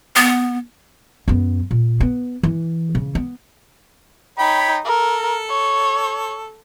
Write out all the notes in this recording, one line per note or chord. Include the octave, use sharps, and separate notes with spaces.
B3
F#2 B3
A#2
B3
E3
C#3
B3
D#4 C#5 G5 B5
A4 A#4
C#5